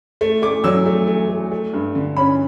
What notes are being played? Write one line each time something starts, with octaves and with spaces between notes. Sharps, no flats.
A3
A3 D6
F#3 E6
A3
A3
A3
A3
G2
D3
C#4 B5